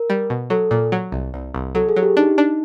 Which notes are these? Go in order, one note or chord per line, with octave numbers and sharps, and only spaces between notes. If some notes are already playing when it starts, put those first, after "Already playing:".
Already playing: A#4
G3
B2
F#3 A4
A#2
F#3
C2
C2
C2
F#3 A4
G#4
F#3
G4
D4 D#4
D4